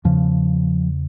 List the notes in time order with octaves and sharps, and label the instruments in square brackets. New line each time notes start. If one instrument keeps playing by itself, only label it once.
[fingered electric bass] E2 C#3 F3